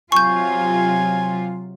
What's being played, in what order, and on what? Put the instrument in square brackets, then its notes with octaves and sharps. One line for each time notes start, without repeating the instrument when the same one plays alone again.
[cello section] C3 F#3 F4 [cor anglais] G#5 [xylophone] C#6 G6